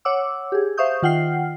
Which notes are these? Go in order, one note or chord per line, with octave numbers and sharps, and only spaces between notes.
C#5 F#5 D6 E6
G4 G#4
C5 E5 F5 C#6 D#6 G6
D#3 F4 F#5 G5 F6 C7